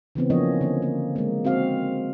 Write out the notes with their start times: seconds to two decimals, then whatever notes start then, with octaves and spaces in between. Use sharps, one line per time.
0.15 C#3 E3 B3 C4
0.30 F3 A#3 C#4 D4 C#5 D#5
0.61 D3 A#3
0.82 A#3
1.16 G#3 A#3
1.45 C4 F#4 F5